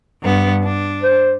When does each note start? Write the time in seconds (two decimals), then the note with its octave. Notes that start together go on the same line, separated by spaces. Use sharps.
0.21 G2 B3
0.64 D4
1.03 C5